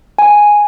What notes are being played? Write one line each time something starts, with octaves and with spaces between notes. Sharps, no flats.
G#5